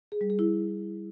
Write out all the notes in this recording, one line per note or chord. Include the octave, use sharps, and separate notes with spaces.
G#4
G3
G#4
E4